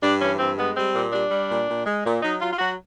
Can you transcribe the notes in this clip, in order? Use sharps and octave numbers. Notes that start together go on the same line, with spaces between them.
G2 D4
E3 C#4
G2 C4
G#3 B3
G3 C4
A#2
G3 D4
G3
A#2
A#2
G#3
A#2
F#3 D#4
F#3 F4
F4
F#3 F#4